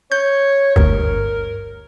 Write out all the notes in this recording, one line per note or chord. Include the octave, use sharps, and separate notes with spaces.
C#5 G6
G1 D2 G2 A#4